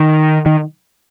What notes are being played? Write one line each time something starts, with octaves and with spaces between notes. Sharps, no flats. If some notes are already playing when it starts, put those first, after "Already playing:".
Already playing: D#3
D#3